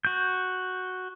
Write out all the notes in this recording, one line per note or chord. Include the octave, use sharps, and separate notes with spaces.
F#4 G6